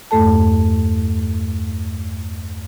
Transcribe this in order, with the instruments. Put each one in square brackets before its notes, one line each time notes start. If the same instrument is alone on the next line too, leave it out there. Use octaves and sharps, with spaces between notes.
[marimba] E2 G2 A3 A4 A5